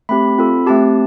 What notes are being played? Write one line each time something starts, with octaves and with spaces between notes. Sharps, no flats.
A3 C4 G4 B5
C4 F4 A4
A3 C4 G4 A5